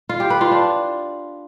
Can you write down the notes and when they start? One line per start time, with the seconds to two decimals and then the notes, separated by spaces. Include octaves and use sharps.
0.09 F4
0.20 G4
0.30 B4
0.41 F4
0.51 D4